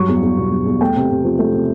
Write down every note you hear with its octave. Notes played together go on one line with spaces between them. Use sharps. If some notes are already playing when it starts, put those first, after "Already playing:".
Already playing: G2 F#3 C#6
E2
E2
B2
F#3
E2
A3 G5
C3
C3
F3
A3
C3